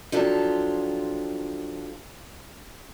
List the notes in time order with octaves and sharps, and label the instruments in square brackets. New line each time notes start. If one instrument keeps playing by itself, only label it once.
[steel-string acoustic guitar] F3 F#3 D4 F4 G4 A4